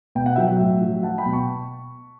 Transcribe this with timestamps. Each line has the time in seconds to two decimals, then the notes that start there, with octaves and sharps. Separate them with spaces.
0.15 B2 G5
0.26 F#5
0.36 F#3 E5 G5
0.60 A2
0.82 F#3
1.03 F#3 F#5 A5
1.18 G5 B5
1.26 B2
1.33 A5 C#6